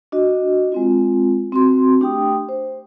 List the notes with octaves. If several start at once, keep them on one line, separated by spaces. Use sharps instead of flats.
D4 F#4 D#5
G#3 C4 F4
C4 F#4 C6
A3 D4 G4 G5 D#6
C5